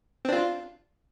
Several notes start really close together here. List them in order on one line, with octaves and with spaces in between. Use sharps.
C4 D4 F4